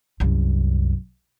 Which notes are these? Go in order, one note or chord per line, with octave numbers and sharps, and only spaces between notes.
C2 F#2